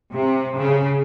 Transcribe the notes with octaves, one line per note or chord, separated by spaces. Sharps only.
C3
C#3